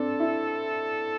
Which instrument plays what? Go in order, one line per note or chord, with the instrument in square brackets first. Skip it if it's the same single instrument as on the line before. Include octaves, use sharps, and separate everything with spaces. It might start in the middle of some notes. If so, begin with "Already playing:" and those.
Already playing: [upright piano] C4 D4 [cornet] A4
[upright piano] E4